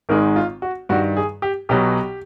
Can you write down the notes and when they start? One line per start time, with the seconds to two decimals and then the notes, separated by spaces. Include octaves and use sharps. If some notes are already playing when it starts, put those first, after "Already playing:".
0.09 G#1 G#2 D#3 G#3 A#4
0.36 F4
0.62 F#4
0.89 G2 D#3 G3 F#4
1.17 G#4
1.42 G4
1.69 B1 B2 F#3 G4